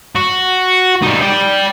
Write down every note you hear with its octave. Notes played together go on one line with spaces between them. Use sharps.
F#4
G3 D#4
D5 G5